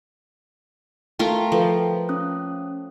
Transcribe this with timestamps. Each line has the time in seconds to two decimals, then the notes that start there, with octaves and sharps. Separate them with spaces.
1.19 A3 F4 A#4 G5
1.52 F3 A4 B4 G5
2.09 C#4 D#6 F#6